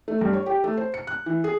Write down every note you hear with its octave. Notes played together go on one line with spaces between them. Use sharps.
A3
G2
C#5
G4
A3
C5
C#7
F#6
E3
G#4